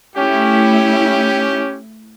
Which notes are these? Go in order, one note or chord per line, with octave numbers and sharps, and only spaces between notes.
A3 C#4 E4 G4